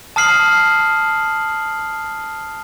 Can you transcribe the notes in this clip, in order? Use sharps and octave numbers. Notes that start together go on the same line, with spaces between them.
A5 D#6 F6 C7 F#7